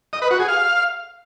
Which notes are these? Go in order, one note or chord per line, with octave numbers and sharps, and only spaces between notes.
D#5
B4
F#4
G#4
F5